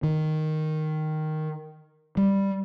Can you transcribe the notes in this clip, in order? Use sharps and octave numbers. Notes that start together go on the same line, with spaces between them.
D#3
G3